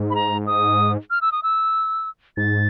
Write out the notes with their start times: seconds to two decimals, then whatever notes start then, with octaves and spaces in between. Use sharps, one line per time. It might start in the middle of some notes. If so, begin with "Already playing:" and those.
Already playing: G#2
0.10 B5
0.15 A#5
0.47 D#6
1.11 F6
1.21 E6
1.32 D#6
1.43 E6
2.37 G#2 A6